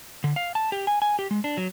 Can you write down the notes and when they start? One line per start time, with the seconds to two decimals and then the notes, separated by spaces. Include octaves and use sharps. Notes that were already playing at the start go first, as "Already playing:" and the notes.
0.24 D3
0.36 F5
0.55 A5
0.72 G4
0.87 G#5
1.02 G#5
1.19 G4
1.31 G#3
1.44 D4
1.57 F#3